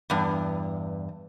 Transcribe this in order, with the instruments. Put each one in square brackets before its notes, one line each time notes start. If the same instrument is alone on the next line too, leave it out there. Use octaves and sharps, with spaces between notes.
[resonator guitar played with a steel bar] E2 G2